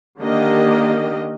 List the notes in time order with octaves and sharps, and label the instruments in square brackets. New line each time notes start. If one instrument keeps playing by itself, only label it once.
[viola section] D3 D#3 A#3 G4 D#5